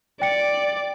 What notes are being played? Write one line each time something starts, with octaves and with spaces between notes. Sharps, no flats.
D5 G5 C#7